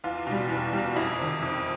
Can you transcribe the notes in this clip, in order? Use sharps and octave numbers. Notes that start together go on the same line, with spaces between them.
E2 F4
B2 G3
E2
B2 G3
F2 E4
C3 D#3
F2